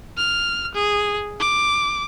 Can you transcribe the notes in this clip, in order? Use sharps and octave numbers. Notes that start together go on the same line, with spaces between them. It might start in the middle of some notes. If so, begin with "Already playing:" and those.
F6
G#4
D6